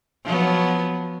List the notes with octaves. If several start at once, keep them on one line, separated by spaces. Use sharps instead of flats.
F3 F#3 B3